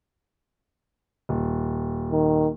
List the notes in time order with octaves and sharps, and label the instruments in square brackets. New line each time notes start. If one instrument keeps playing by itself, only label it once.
[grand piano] D#1
[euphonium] D#3